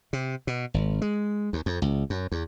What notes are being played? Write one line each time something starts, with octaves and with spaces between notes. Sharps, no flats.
C3
B2
G#1
G#3
D#2
F2
C#2
F#2
E2